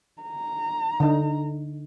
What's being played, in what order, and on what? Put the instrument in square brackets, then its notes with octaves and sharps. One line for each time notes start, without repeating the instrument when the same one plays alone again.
[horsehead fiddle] A#5
[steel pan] D3 D#4